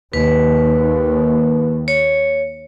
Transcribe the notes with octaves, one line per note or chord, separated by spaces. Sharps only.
D#2 B4
C#5